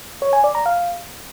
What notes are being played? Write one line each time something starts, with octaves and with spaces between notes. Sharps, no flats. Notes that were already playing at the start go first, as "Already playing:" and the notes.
C#5
G#5
D5
A#5
F5